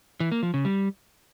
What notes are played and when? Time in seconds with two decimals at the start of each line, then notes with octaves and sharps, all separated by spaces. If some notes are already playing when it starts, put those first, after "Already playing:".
0.20 E3
0.32 A#3
0.43 F3
0.54 C#3
0.65 G3